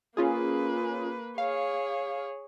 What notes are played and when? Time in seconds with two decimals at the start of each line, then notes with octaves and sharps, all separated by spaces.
0.17 A#3 C#4 F4 G#4 B4
1.38 G#4 C#5 F5